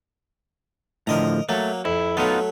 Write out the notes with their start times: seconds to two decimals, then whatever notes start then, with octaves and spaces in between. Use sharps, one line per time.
1.07 A2 D3 F3 A#4 D#5 A#5
1.49 F#3 A3 A#3
1.85 F2 E4
2.17 F#3 A3 B3 D#4 F4